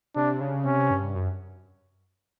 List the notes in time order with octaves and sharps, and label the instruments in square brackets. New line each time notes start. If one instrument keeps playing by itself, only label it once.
[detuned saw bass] C3 [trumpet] D4
[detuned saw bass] C#3
[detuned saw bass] C3 [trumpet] C#4
[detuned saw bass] G2
F#2